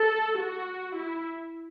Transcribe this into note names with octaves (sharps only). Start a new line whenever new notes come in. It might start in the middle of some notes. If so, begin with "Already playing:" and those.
Already playing: A4
F#4
E4